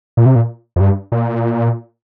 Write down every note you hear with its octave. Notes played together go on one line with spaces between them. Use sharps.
A#2
C3
A#2
F2
G2
A#2